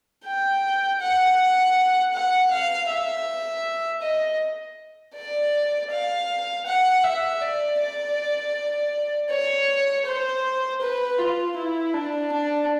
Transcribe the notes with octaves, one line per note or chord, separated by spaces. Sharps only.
G5
F#5
F#5
F5
E5
D#5
D5
F5
F#5
E5
D5
D5
C#5
C5
B4
F4
E4
D4
D4